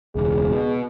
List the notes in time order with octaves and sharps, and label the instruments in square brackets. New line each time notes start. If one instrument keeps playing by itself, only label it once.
[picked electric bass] E1 C#2 [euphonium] G#4
[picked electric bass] B2